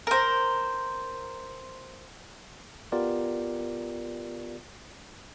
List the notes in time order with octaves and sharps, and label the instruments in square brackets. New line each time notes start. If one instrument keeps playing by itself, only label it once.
[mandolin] A#4 C5
[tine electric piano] B3 F4 G4 A#4 D5